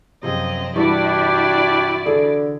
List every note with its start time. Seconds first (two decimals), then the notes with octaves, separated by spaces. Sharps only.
0.23 F#2 C3 F3 C4 G#4 D#5
0.76 G2 E3 D4 E4 F#4 G4 D5
2.06 D3 G#4